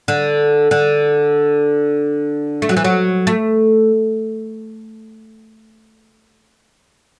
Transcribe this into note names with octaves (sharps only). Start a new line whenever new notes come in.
D3
D3
A3
F#3
E3
F#3
A3